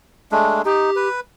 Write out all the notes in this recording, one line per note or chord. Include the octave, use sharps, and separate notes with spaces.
G#3 A3 D4
D#4 G4
B4